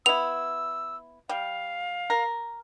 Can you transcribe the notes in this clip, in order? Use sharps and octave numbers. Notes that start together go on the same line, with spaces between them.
B3 E4 E6 F7
G3 F5
A#4